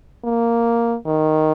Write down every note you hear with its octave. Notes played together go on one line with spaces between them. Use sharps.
A#3
D#3